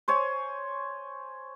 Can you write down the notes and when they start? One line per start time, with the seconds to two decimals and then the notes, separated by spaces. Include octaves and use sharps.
0.08 C5 C#5 G#5